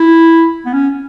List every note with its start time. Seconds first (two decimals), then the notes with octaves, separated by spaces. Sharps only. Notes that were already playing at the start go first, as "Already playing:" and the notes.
Already playing: E4
0.65 B3
0.73 C#4